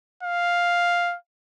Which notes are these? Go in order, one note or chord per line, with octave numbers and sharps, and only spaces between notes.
F5